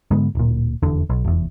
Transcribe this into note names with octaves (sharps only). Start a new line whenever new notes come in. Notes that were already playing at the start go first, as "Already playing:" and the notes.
G#2 D3 G#3 B3
D1 A#2
F1 E2 D3
B1
F1 E2